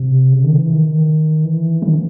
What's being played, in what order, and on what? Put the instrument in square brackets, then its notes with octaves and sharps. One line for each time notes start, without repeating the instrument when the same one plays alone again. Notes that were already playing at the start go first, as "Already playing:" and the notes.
Already playing: [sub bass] C3
C#3
D#3
E3
D#3
E3
D#3